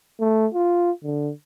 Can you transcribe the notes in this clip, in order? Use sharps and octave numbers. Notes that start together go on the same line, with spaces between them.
A3
F4
D3